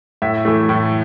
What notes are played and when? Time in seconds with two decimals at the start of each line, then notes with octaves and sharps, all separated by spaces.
0.22 A2 E5
0.45 E3 A3
0.69 A2